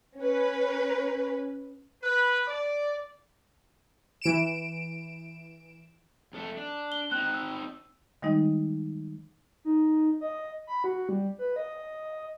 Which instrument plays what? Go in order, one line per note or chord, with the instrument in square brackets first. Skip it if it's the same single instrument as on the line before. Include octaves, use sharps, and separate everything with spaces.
[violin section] C#4 B4
[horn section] B4
D5
[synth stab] E3 D7 E7
[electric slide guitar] F2 A4 E5
D4
[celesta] G7
[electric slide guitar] C4 D#4 [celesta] F#6
[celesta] E6
[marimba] D#3 G3 G#3 D#4 D#5
[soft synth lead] D#4
D#5
B5
F#4
G3
B4
D#5